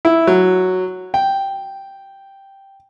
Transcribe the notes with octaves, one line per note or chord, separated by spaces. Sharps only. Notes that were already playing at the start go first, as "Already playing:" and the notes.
E4
F#3
G5